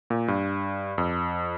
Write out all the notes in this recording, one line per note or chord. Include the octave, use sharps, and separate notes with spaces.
A#2
G2
F2